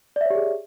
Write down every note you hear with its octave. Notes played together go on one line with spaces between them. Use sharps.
G4 G#4 C#5 D5 E5